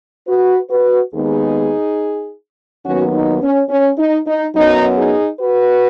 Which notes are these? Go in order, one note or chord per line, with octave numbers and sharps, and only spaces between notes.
F#4 B4
F#4 B4
D#2 D#3 G#3 B3 D#4 G#4
D#2 D#3 F#3 B3 C#4 F#4
D#4
C#4
C#4
D#4
D#4
F#2 F#3 B3 D#4
D#4 G#4
F#4 B4